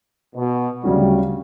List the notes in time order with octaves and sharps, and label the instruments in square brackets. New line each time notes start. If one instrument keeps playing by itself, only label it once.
[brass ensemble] B2
[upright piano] D2 C#3 F#3 C#4 F#4 [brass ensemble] G3